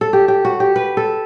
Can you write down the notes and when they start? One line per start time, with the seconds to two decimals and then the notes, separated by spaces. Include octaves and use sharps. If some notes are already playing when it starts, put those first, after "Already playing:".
0.01 A4
0.13 G4
0.28 G4
0.45 F#4
0.60 G4
0.76 B4
0.97 A4